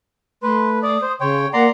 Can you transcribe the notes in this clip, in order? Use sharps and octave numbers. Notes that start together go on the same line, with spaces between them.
A3 B4 C6
D5 D#6
C5
C#3 C#5 G5 C6
A#3 D5 F#5 A#5 C6